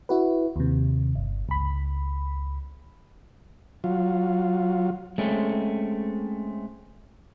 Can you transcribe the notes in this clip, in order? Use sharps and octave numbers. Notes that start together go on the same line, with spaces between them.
E4 F#4 B4
D#2 C3
G1
C#2 B5
F#3 F4
G#3 A3 C4 C#4